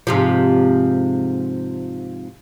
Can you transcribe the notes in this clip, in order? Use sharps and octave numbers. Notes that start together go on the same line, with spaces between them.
G#2 C3 F3